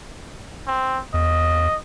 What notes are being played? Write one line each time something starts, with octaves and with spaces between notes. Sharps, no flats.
C4
E2 D#5